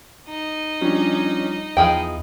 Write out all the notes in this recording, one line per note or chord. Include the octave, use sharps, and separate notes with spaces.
D#4
F3 G3 C#4 D4
E2 F3 G#4 D#5 G5 B5